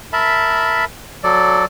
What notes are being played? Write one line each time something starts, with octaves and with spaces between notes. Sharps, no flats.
A#4 E5 A5 B5
F#3 A4 D5